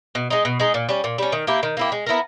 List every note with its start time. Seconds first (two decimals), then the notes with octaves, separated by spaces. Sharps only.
0.15 B2
0.30 G#3 D#4
0.45 B2
0.60 G#3 D#4
0.74 A#2
0.89 G3 C#4
1.04 A#2
1.18 G3 C#4
1.32 D#3
1.47 A#3 E4 G4
1.63 D#3
1.77 A#3 E4 G4
1.92 G#3
2.06 B3 E4 A#4